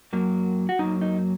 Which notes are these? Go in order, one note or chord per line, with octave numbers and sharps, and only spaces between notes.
F#2 F#3 A#3
F#4
F#2 F#3 A#3 D#4
D#4